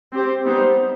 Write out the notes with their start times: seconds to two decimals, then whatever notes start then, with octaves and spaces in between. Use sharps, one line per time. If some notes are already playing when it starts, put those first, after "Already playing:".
0.13 C4 G4 C5
0.44 G3 B3 D#4 G4 C5